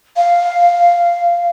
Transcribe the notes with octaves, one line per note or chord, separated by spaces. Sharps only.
F5